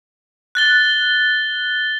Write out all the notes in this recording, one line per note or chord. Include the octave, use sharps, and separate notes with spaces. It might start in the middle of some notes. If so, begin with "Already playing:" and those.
F#6 A6 G7